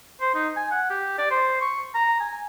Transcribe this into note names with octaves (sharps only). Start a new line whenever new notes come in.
C5
D#4
G#5
F#5
G4
D5
C5
C#6
A#5
G#5